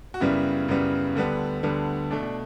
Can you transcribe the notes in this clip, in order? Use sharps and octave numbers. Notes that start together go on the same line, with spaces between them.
F#4
F#2 C#3 G3 B3 E4
F#2 C#3 G3 B3
D2 D3 G3 B3
D2 D3 G3 B3
B2 A3 D4
D4